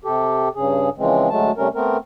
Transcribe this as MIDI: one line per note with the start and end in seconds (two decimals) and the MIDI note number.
0.05 0.49 48
0.05 0.49 67
0.05 0.49 69
0.55 0.89 43
0.55 0.89 49
0.55 0.89 68
0.98 1.29 49
0.98 1.29 52
0.98 1.29 53
0.98 1.29 56
0.98 1.29 60
1.30 1.51 38
1.30 1.51 54
1.30 1.51 56
1.30 1.51 57
1.30 1.51 81
1.57 1.68 48
1.57 1.68 55
1.57 1.68 57
1.57 1.68 61
1.57 1.68 70
1.75 1.97 57
1.75 1.97 59
1.75 1.97 60
1.75 1.97 70